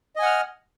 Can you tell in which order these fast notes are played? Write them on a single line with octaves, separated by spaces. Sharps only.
D#5 G#5 F#5 F6